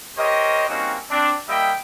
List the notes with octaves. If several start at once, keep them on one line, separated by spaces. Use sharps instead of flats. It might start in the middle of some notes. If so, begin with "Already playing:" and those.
G4 A#4 C5 C#5 D#5
G3 A#3 C4 C#4 D#4 F#4
C4 D4
G3 A#3 D#5 E5 G5 B5